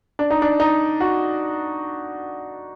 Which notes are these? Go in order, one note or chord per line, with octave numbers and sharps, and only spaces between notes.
D4
D#4
D4
D#4
F#4